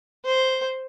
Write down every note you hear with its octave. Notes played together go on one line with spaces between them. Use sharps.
C5